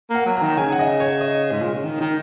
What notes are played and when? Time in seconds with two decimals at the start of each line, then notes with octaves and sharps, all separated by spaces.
0.10 A#3
0.15 F#5
0.26 F#3
0.36 A#5
0.42 D#3
0.57 C#3 G#5
0.72 F#5
0.79 D#5
1.00 C#5
1.21 D#5
1.51 G#2
1.62 A#2
1.74 C#3
1.84 D#3
2.01 D#3